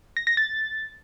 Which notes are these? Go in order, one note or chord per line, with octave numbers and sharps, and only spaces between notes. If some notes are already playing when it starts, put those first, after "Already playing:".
A#6
A#6
A6